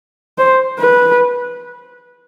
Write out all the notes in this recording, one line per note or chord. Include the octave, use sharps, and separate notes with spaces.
C5
B4